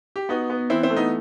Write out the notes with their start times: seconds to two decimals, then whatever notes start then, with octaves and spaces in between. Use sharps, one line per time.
0.16 G4
0.29 B3 D#4 F#4
0.50 B3
0.70 E3 C4 E4
0.83 C4 E4
0.90 A3
0.96 B3 D#4